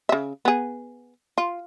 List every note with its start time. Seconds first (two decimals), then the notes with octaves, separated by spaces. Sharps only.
0.09 C#3 E5
0.45 B3 G#4
1.38 F4